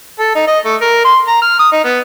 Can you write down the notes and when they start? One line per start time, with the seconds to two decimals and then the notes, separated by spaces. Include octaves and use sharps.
0.19 A4
0.35 D#4
0.47 D#5
0.65 A3
0.81 A#4
1.04 C6
1.28 A#5
1.42 F6
1.59 D#6
1.72 D#4
1.84 B3